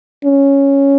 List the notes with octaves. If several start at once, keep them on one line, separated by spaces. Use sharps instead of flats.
C#4